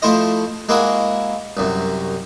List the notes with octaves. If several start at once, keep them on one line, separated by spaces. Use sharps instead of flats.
F3 A3 E4 C5 D#5
G#3 A#3 E4 F#4 G#4
C2 F#2